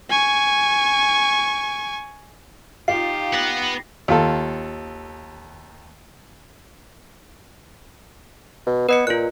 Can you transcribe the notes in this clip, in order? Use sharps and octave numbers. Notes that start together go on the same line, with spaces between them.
G#5 C#6
D#4 F4 G4 C7
B3 F#5 A#6
D#2 F4 A4
B2
B3 B4 D#5 C#7
A#2 F4 F#6